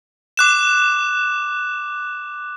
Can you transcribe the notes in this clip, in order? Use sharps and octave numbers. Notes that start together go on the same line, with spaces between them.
D6 F#6 E7